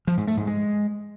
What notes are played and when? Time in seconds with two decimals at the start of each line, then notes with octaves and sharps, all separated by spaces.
0.07 F3
0.17 G#2
0.27 A3
0.37 G#2
0.47 G#3